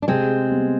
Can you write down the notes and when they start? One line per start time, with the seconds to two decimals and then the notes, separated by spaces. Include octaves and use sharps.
0.02 D4
0.08 C3 G#3 C4
0.49 G3 B3